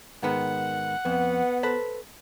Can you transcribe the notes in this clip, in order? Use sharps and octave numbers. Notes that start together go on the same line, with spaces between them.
G#2 D#3 B3 F#5
F2 B3
A4 B4 C5